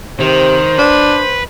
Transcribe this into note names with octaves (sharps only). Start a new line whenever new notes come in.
C3 D#3 C5
D4 B4